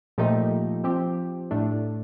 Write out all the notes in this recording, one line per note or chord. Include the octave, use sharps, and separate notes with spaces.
A#2 F3 A3 D#4 G4
F3 C4 G4
A2 A3 D4